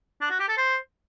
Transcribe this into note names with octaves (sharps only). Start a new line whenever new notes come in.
D4
F#4
G4
A4
C5